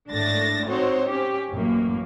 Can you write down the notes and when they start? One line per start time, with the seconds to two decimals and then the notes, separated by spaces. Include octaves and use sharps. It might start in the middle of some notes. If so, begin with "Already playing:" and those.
0.10 G#1 A2 A3 D4 A6 A#6
0.68 C4 D#4 F#4 C5 C#5
1.08 C#4 G4
1.51 A1 F#2 A2 A#3